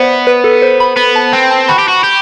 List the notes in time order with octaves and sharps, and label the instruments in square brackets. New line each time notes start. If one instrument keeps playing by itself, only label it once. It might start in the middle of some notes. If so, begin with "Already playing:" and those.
Already playing: [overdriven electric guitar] B3 [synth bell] C5 D5 E5
[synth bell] B4
A4
C5
B5
[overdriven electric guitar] B3 [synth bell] B5
[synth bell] A5
[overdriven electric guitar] C4 [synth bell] G5
[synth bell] A5
[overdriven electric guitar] F#4 [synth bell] B5
[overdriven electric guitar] G4
F#4
G4